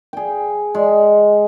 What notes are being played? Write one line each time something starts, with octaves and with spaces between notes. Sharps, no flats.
G#4 G5
G#3